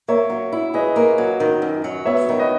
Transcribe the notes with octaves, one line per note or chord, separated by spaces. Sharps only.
A#3 C#5 E5
F#3
E4
G#4 B4 D#5
A#3
F#3
D#3
F#2
F#3
B3 C#5 E5
D#3
B4 D#5